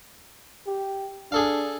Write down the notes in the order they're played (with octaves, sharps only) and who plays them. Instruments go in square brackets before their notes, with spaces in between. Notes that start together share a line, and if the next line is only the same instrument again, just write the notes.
[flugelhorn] G4
[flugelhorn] D4 [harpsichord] G#4 A4 F5